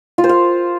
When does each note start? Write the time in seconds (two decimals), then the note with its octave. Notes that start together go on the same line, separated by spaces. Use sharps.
0.18 F4
0.24 C5
0.29 F5